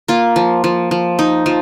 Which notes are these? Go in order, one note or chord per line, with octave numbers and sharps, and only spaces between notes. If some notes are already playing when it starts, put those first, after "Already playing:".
A#3 F4
F3
F3
F3
D#4
F3